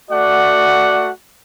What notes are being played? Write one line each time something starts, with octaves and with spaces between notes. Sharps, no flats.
A3 F#4 D5 F#5